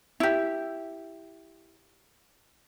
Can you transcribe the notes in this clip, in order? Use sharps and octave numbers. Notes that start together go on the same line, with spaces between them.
E4 G4